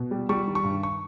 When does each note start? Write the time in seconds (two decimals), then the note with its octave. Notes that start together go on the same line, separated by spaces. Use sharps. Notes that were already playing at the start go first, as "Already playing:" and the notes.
Already playing: B2
0.11 G3
0.29 G3 C#6
0.48 D#3
0.55 C#6
0.64 G2
0.83 C#6